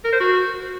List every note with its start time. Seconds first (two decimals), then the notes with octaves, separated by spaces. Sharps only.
0.05 A#4
0.12 C5
0.20 F#4